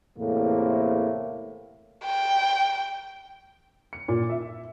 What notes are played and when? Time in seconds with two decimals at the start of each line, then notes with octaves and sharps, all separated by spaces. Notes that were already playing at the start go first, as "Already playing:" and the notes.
0.18 E2 A2 C3 A3 A#3
2.04 G5
3.93 C#7
4.08 A#2
4.30 E5